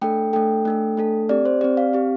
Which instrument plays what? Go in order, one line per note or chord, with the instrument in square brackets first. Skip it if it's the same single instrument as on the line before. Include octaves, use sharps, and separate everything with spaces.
[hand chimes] A3 D4 A4 G5
A3 D4 A4 G5
A3 D4 A4
A3 D4 A4
C4 G4 D5
C5
C4 G4 D5
F5
C4 G4